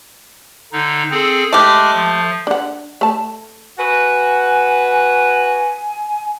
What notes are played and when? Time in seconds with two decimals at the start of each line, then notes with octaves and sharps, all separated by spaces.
0.72 D3 D#4
1.11 C4 G#4 A4
1.53 G#3 A3 G4 D6 F6
1.94 F3
2.47 D4 F#5
3.01 A3 A5
3.78 F#4 B4 G#5